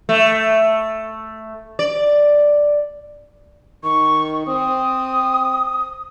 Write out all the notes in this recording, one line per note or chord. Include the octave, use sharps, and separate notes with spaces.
A3
D5
D#3 C#6
C4 D#6